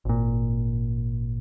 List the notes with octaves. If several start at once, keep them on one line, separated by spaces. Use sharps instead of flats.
G#1 A#2